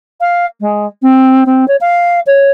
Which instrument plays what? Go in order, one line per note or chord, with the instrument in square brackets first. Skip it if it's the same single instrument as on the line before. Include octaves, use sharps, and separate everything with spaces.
[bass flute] F5
G#3
C4
C4
C#5
F5
C#5